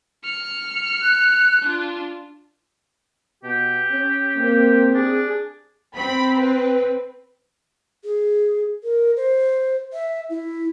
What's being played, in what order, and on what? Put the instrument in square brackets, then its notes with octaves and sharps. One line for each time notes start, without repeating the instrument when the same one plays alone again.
[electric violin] F6 C#7
[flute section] F#6
[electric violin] D4 F4
[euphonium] B2 [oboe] G4
[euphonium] C#4
[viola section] A#3 [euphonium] C4
[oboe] D4 [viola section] G#4
[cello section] C4 [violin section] B5
[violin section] B4
[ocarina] G#4
A#4
C5
E5
E4